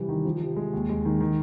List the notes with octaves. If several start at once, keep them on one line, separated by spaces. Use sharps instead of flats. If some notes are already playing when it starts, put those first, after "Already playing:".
Already playing: C3 E3 G3
D#3
F3
C3
G#3
D#2
G#3
D#3
D#3